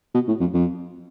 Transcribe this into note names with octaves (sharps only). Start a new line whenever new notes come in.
B2
A2
F2
F2